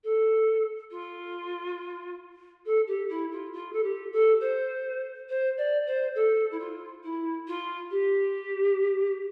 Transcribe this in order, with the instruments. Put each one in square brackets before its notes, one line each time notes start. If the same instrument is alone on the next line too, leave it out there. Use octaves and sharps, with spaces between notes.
[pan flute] A4
F4
A4
G4
E4
F4
F4
A4
G4
A4
C5
C5
D5
C5
A4
E4
F4
E4
F4
G4